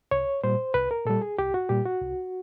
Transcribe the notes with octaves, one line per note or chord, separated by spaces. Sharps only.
C2 C#5
A#2 G3 C5
C2 B4
A#4
A#2 G3 A4
G#4
C2 G4
F#4
A#2 G3 G4
F#4
C2